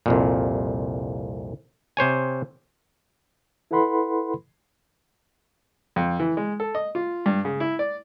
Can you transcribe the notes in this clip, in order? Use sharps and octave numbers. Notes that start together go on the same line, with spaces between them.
C2 F2 A#2
C3 C5 C#5 G#5
E4 A4 B4 F#5 B5 C6
F2
E3
G#3
A4
D#5
F4
G2
C#3
E4
D5